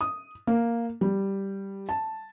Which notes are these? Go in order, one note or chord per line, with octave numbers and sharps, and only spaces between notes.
D#6
A#3
G3
A5